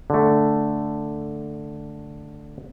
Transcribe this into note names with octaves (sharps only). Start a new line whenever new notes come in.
D3 A3